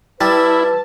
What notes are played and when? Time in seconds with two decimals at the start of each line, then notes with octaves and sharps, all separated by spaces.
0.21 G3 E4 B4 A5